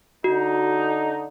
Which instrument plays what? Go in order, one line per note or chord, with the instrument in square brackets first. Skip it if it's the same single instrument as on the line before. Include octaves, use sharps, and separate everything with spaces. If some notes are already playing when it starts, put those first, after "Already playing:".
[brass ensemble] D3 D#4 [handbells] F#4